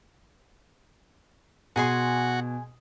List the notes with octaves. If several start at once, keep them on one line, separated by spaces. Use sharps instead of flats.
B2 F#4 G#4 G#5 C6